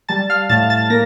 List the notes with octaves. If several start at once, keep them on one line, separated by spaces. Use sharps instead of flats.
G3 A5 A6
F5 F6
A2 A5 A6
A5 A6
A#3 A#6